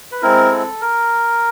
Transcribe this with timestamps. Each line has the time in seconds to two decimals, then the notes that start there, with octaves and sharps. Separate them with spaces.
0.12 B4
0.22 G#3 C4 E4 A#4
0.51 A4
0.81 A#4